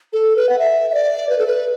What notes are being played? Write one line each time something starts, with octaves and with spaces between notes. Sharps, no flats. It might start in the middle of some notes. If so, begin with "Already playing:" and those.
A4
B4
F#5
E5
E5
D5
B4
A4
B4